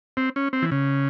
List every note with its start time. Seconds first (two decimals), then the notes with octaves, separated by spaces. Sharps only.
0.17 C4
0.36 C#4
0.53 C4
0.62 E3
0.71 C#3